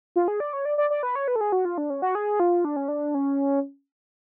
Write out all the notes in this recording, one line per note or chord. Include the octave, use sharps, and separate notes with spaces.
F4
G#4
D5
C#5
D5
D5
D5
B4
C#5
B4
A4
G#4
F#4
F4
D4
C#4
F#4
G#4
F4
D4
C#4
D4
C#4